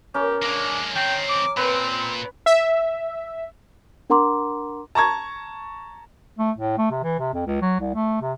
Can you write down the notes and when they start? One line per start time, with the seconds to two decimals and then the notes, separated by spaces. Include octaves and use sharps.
0.14 C#4 G4 A#4
0.42 G#3 A#3 D4
0.95 D#3 C4 G5
1.29 D6
1.57 A#2 C4 B4
2.46 E5
4.10 D4 A#4 F#5 A#5 C6 D6
4.95 A5 A#5 C#6 G#6
6.39 A3
6.58 A2
6.78 A3
6.91 C3
7.03 E3
7.19 C3
7.34 F2
7.47 C#2
7.62 F#3
7.80 C2
7.95 A3
8.22 C3